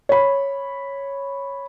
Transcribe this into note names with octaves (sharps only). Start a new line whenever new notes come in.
C#5 B5